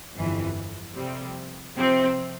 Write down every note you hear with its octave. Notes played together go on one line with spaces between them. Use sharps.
G1 F2 E3
F2 C3 G3 C4
C3 F3 C4